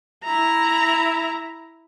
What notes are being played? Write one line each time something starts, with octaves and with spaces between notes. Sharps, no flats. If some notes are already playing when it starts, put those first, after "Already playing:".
E4 A#5